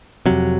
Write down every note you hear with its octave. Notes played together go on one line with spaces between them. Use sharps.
F2 C3 F#3